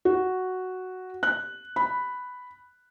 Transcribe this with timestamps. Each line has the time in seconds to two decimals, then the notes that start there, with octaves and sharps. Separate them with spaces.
0.05 F#4
1.23 F#6
1.76 B5